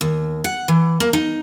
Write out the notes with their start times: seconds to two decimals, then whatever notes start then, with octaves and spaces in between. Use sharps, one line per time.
0.01 D#2
0.44 F#5
0.68 E3
1.00 A#3
1.13 D#4